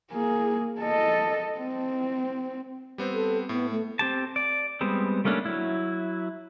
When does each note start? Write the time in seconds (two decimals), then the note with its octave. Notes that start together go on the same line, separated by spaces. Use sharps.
0.11 A#3 G#4
0.80 A4 D#5
1.59 C4
2.98 G3 B3 C4
3.14 A4
3.49 A2 B3
3.71 A3
3.99 C4 G4 A5
4.36 D5
4.81 G3 G#3 B3 C4
5.25 G3 A3 A#3 C#4 D4
5.45 F#3 E4